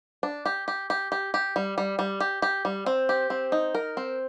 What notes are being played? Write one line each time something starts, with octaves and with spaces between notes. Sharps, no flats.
D4
G4
G4
G4
G4
G4
G3
G3
G3
G4
G4
G3
C4
G4
C4
D#4
A#4
C4